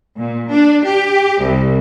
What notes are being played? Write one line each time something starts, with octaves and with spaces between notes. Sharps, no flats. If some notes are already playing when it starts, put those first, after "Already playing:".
A#2
D4
G4
C2